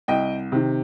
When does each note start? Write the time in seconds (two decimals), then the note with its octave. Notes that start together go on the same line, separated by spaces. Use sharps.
0.08 C2 D#5 G5
0.52 C3 D#3